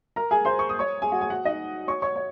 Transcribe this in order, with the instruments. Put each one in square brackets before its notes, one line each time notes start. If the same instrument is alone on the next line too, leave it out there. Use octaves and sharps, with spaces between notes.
[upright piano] A#4 A#5
G#4 G#5
C5 C6
C#6
D#6
C#5 C#6
G#4 G#5
F#4 F#5
G#4 G#5
F#4 F#5
D#4 D#5
C#5 C#6
C#5 C#6
C#5